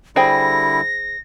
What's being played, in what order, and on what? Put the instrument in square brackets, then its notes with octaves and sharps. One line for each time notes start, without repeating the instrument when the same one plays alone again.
[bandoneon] D3 G3 E4 [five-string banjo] G#4 C5 G5 [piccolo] A#6